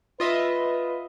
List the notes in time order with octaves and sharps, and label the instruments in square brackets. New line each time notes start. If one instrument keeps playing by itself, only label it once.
[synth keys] F4 D#5 E5 [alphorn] B4